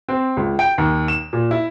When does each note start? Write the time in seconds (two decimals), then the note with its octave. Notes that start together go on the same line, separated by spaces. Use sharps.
0.09 C4
0.37 C#2
0.59 G5
0.78 D#2
1.08 E7
1.33 A#2
1.51 E4